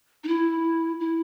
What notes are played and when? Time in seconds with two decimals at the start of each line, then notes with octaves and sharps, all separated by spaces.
0.24 D#4
0.28 E4
1.00 E4